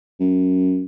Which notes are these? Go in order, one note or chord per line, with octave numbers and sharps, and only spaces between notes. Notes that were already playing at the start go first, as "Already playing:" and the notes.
F#2